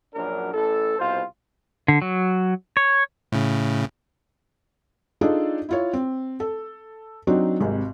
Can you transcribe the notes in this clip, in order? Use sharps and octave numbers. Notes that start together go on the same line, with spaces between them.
A#1 F#2 F#3 D4 A#4
A1 A4
C2 B2 F4 C5
D3
F#3
C#5
A2 C#3
D4 D#4 F4 G#4 A4 D5
E4 F4 C#5
C4
A4
F#3 C4 D4 D#4 F#4
G#1 G#2 C3